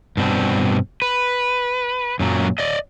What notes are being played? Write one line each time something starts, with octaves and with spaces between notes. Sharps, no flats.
G2 B2 C4
B4
F#2 A#2 F#3
D5 D#5